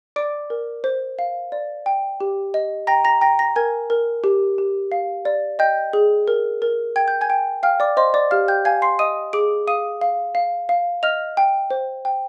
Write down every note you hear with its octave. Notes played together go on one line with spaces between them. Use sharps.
D5 D6 D7
A#4
C5
F5
D5
G5
G4
D#5
G5 A#5 A#6
A#5 A#6
G5 A#5 A#6
A#5 A#6
A#4 G#5 G#6
A#4
G4
G4
F5
D5
D#5 G5 G6
G#4
A#4
A#4
G5 G#6
G6
G#5 G#6
G5
F5 G5 F6
D5 D6
C5 D#5 C6
D5 D6
G4 F5 F6
G5 G6
F5 G#5 G#6
C6 C7
D#5 D#6 D#7
G#4 D6 D7
F5 D#6 D#7
F5
F5
F5
D#5 F6 F7
G5
C5
G5